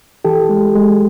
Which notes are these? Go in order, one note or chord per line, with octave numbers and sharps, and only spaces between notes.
E3 G4 A4
G#3
G#3